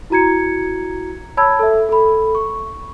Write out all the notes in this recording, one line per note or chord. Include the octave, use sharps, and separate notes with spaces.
E4 F#4 A#5 G#6 C#7
C#5 A5 B5 E6 G#6
A4 E5
A4 B5
C#6